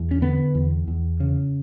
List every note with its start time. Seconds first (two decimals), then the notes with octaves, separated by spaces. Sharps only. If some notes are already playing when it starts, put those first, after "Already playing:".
Already playing: E2
0.11 C#4
0.22 D3 B3
0.55 E2
0.88 E2
1.20 C#3